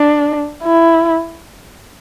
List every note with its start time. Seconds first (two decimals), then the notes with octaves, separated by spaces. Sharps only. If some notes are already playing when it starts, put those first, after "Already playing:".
Already playing: D4
0.63 E4